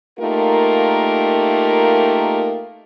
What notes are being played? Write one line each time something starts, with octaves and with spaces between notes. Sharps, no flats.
A3 A#3 D#4 F4 G4 A#4